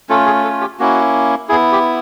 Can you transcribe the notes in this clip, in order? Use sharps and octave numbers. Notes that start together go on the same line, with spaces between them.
A3 C#4 F4 A4
G#4
A4
G4
A#3 C#4 E4 F#4
B3 E4 G#4
G4